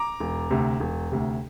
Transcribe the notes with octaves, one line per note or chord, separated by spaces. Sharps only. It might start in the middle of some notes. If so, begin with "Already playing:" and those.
Already playing: A#5 D6
E1
D2 C3
E1
D2 C3